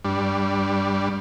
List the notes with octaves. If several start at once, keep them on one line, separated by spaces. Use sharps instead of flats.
G2 G3 D4